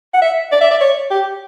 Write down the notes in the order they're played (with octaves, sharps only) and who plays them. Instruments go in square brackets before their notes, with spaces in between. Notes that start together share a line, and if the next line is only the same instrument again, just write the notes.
[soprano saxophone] F#5
E5
D5
E5
D5
C#5
G4